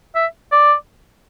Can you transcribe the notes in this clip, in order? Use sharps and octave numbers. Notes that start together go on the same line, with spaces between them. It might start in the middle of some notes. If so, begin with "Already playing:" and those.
E5
D5